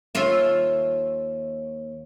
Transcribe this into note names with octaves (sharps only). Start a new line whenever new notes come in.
D#2 F4 E5